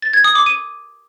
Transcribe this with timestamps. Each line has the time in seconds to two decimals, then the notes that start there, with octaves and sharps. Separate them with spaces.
0.02 A6
0.13 G#6
0.24 D#6
0.35 D6
0.46 D#7